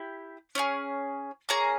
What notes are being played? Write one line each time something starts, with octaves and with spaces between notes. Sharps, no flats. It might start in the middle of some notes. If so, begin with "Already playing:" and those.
Already playing: E4 G4
C#4 E4 G#4
A#3 C#4 G#4 A#5